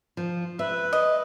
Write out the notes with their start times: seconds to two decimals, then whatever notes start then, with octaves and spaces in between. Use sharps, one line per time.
0.17 F3
0.59 B4 E5
0.93 D#5